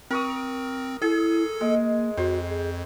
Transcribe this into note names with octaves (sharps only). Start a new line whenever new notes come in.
C4 A#4 C#6 D#6
E4 G#4 A4
G#3 A#3
F2 F#4 C5
G#4